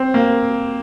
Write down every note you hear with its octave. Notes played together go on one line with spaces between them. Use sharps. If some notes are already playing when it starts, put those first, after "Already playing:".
Already playing: C4
A#3